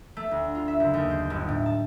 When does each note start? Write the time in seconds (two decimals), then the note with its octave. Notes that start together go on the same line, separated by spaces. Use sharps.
0.17 A3
0.31 D2
0.55 F4
0.68 E5
0.80 F#1
0.94 D#2
1.10 C5
1.30 G1
1.49 A2
1.66 A5